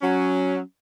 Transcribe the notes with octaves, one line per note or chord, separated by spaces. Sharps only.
F#3 C#4